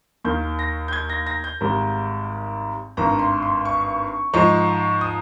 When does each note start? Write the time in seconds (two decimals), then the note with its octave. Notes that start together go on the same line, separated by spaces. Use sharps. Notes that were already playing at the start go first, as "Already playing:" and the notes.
0.24 D#2 D#3 A#3 G6
0.59 A#6
0.88 G6
0.93 G#6
1.09 A#6
1.27 A#6
1.44 G6
1.61 G#1 G#2 D#3 G3
2.97 G#1 G2 D#3 A#5
3.19 C6
3.42 C6
3.65 C#6
4.33 G#2 F3 G#3 D#4 C#6
5.01 D#6